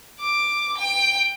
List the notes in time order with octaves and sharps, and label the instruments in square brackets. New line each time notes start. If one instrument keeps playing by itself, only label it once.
[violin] D6
G5